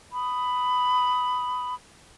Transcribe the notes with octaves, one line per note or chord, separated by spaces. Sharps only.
B5 D#6